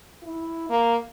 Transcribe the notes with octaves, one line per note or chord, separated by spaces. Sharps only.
E4
A#3